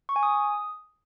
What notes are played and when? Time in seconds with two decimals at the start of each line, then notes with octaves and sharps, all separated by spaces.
0.09 C#6
0.16 G#5
0.23 D#6